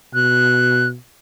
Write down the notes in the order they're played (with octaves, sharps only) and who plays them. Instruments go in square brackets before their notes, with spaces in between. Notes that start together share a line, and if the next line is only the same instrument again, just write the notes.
[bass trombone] B2 [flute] F#6